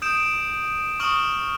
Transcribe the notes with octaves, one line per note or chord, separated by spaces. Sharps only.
D#6 G6 D7 E7
C#6 D#6 F6 E7 F#7